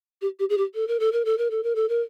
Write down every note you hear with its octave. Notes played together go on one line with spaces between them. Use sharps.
G4
G4
G#4
G4
A4
A#4
A4
A#4
A4
A#4
A4
A#4
A4
A#4